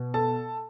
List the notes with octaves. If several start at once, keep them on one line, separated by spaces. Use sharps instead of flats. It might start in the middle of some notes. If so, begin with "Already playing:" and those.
Already playing: B2 B3
A4 A5